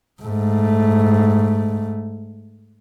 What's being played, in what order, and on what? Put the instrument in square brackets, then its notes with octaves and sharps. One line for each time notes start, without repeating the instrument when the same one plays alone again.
[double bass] G#2 A3